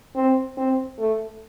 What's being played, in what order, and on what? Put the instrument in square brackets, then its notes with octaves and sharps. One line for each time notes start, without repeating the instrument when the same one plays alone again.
[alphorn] C4
C4
A3